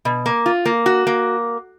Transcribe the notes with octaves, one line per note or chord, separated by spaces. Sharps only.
B2
A#3
F4
A#3
F#4
A#3